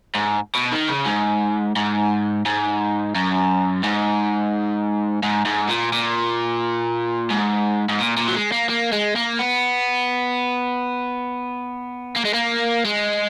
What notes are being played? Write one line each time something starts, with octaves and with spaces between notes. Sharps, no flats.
G#2
B2
D#3
C#3
G#2
G#2
G#2
F#2
G#2
G#2
G#2
A#2
A#2
G#2
G#2
A#2
A#2
F#3
G#3
A#3
A#3
G#3
A#3
B3
A#3
G#3
A#3
G#3